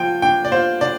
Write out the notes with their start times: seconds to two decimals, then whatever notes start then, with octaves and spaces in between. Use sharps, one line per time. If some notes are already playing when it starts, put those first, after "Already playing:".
Already playing: F3 G5
0.22 D4 G5
0.45 D5
0.52 F4 C5
0.81 D4 D5